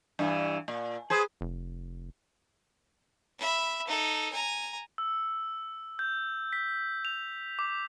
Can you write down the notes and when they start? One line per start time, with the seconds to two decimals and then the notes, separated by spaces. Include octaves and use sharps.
0.19 G2 E3
0.68 A#2
1.10 G#4 B4 C5
1.41 F1
3.38 E5 B5
3.87 D#4 A4
4.33 G#5 A#5
4.98 E6
5.99 G6
6.53 B6
7.05 F7
7.59 D6